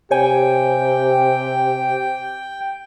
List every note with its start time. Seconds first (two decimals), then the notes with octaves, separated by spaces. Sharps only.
0.11 C3 G4 C#5 G5 G#5